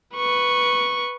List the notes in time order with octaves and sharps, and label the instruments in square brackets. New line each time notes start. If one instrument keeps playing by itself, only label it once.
[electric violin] B4 C#6